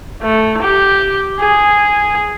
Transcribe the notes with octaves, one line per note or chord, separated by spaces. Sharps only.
A3
G4
G#4